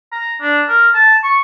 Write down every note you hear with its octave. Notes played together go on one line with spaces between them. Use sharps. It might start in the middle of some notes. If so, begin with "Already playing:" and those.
A#5
D4
A#4
A5
C#6